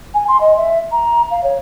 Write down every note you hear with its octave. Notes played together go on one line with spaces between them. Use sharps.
G#5
C6
D#5
E5
A#5
F5
C#5